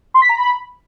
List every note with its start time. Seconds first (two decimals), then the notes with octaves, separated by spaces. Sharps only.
0.14 C6
0.22 B6
0.29 A#5
0.37 B5